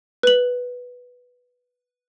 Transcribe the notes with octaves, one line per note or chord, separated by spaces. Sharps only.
B4 F#7